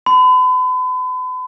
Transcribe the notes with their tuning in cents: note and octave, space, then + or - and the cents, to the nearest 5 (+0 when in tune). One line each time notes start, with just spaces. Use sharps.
B5 +40